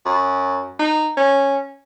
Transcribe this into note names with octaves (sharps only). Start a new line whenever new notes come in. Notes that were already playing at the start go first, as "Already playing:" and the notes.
F#2
D#4
C#4